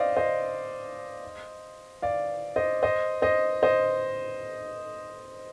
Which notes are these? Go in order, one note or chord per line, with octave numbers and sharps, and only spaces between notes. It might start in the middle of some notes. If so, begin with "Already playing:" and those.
Already playing: C5 D5 D#5 F5
C5 D#5
D5 F5
C5 D#5
C5 D#5
C5 D#5
C5 D#5